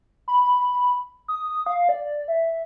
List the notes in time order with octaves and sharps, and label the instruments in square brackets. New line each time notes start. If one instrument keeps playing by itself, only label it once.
[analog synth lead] B5
D#6
F5
D5
E5